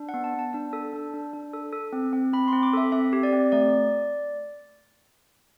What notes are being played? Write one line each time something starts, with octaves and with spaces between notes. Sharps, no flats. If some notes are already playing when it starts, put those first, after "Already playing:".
Already playing: D4
F#5
B3
A5
B3 A5
D4 A5
A4
D4
D4
D4
A4
A4
C4
C4
C4 B5
C6
C4
D6
A4 E5
C4 E5
G4
D5
C4
A3 D5